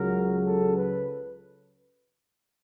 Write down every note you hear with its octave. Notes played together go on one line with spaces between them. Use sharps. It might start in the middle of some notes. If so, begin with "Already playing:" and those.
Already playing: C#2 C#3 F#3 A#4
A4
B4